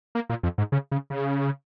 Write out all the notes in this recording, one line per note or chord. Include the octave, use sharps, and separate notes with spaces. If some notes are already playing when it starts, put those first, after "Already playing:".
A#3
A#2
F2
G#2
C#3
C#3
C#3